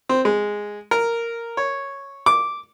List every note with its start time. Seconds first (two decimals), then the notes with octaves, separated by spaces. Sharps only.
0.09 C4
0.25 G#3
0.91 A#4
1.57 C#5
2.26 D6